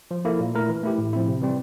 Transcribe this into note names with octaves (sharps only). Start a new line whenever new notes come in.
F3
A#3 E4 A4
A#2
A3 E4 A#4
E3
A3 E4 G4
A2
F3 C4 E4
C3
E3 G3 C4